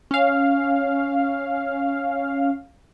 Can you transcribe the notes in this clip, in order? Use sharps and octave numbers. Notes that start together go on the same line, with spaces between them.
C#4 F5